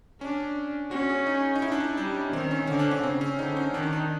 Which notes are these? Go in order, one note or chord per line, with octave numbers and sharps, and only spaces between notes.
C#4 D4
C#4 F#4
G#4
D#4
D#4
E4
D4
D#4
G3 D4
C#4
D#3 C4
C#4
D3 C#4
D4
C#4
C#3 C4
C#4
D3 D#4
C#4
D#3 D4
D#4
D4